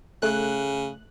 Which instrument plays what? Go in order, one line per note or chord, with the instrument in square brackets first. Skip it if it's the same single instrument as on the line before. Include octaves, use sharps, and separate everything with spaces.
[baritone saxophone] C#3 [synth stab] A3 F#6